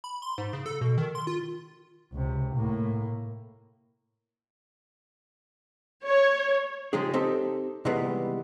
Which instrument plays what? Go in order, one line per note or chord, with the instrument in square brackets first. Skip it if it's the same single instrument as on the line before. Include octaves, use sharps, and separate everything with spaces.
[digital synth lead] B5
C6
G#2
C#3
A4
B2
D#3
C6
F4
[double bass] C#2 C3
A2 A#3
[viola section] C#5
[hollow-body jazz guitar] C#3 F3 G#3 D#4 G4 G#4
C4 D#4 G4 A4
C3 D#3 E3 G3 G#3 B3